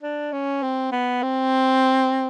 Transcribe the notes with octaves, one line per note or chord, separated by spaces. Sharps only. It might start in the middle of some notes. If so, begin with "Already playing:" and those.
D4
C#4
C4
B3
C4